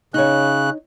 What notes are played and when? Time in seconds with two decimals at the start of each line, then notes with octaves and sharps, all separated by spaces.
0.14 C#3 D#4 C#5 F#6